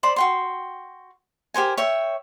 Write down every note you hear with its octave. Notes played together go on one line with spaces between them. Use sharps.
C5 D5 B5 C6
F#4 G5 C6
G4 A#4 C5 G#5
C#5 E5 G5